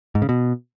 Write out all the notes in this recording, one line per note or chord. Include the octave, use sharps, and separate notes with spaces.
G#2
C#3
B2